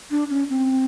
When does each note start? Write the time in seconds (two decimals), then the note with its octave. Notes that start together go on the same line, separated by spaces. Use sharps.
0.11 D4
0.30 C#4
0.50 C4